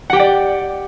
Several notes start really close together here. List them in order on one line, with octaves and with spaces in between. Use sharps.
F#5 G4 G5 D5